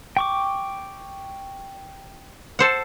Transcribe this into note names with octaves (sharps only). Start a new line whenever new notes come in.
G5 C#6 D6
A4 C5 F#5